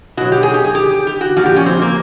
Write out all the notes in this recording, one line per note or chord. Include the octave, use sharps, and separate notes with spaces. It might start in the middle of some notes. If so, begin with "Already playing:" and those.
B2 F#3 F#4
G4
G#4
G4
G#4
G4
G4
F#4
A#2 F3 F#4
G4
C#4
C4
A#3